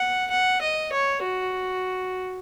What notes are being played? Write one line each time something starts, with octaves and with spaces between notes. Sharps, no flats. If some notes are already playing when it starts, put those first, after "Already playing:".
Already playing: F#5
F#5
D#5
C#5
F#4